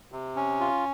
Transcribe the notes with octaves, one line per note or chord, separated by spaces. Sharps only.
C3
C#4
F4